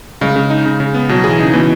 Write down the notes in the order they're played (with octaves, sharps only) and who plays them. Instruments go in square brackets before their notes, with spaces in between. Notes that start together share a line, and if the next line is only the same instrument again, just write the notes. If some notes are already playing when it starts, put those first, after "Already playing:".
[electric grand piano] C#3 [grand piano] G#3
[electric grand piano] C#3
D#4
C#3
C#3
B3
[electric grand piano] B2 [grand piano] F#3
[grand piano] E3 [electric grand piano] G#4
[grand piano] C#3 [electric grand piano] D#4
[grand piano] B2 [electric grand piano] E3